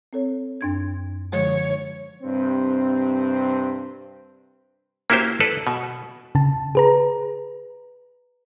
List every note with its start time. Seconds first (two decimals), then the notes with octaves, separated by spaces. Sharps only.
0.13 C4 A4 C#5
0.61 F#2 D4 G#6
1.33 D3 F3 G#3 C#5
2.23 G2 C3 C4
5.10 A#3 C#4 E4 F#4 G4 C5
5.40 A4 B4 D5
5.67 B2
6.35 C#3 A5
6.75 G#4 B4 A#5